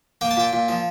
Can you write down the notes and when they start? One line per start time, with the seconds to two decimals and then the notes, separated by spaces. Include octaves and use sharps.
0.21 A#3 G5
0.31 A5
0.37 A#2 G5
0.53 A#2
0.69 F3